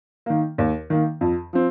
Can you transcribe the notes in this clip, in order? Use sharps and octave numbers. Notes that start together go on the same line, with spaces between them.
D#3 A#3
D#2
D#3 A#3
F2
F3 C4